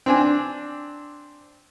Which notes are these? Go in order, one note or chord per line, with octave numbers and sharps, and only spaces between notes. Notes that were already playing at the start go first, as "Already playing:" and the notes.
C4 D4 G#5